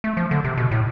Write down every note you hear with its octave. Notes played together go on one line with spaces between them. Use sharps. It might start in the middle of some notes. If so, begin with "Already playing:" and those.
A3
F3
D3
C3
B2
A2